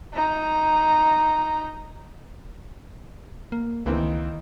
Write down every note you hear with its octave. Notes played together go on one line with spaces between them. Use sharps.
D#4 A#5
A#3
C#2 D#3 E3 A#3 C4